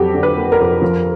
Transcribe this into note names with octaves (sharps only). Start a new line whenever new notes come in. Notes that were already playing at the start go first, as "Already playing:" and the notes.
Already playing: F2 F#3 F#4 G4 A4
D3
B4
A#3
A#4
F2
F3